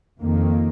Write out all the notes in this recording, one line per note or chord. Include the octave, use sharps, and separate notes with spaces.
F2 D#3 A#3